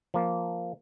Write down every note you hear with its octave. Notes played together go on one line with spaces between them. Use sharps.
F3 A#3